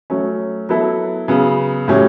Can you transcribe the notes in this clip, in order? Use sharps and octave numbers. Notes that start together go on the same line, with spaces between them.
F#3 A3 C#4
F#3 B3 E4 A4
C#3 F#3 B3
A2 F#3 A3 C#4 G4